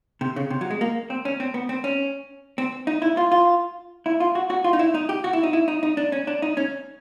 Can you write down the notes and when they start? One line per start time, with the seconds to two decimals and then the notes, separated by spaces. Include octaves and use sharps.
0.21 C3
0.36 C#3
0.50 C3
0.61 F#3
0.71 G#3
0.81 A#3
1.10 C4
1.25 C#4
1.40 C4
1.54 B3
1.69 C4
1.84 C#4
2.58 C4
2.87 D#4
3.02 E4
3.17 F4
3.32 F4
4.06 E4
4.20 F4
4.35 F#4
4.50 F#4
4.64 F4
4.73 D#4
4.79 E4
4.95 D#4
5.09 G4
5.24 F#4
5.33 E4
5.43 D#4
5.53 E4
5.68 D#4
5.83 D#4
5.97 D4
6.12 C#4
6.27 D4
6.42 D#4
6.57 C#4